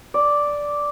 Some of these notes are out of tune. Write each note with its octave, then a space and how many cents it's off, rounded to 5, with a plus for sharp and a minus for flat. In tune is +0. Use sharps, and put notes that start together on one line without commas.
D5 -5